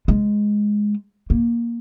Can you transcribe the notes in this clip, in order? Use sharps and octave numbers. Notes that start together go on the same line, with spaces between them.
G#3
A#3